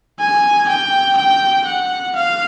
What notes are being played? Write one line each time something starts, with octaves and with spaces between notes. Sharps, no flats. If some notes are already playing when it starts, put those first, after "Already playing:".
G#5
G5
G5
F#5
F5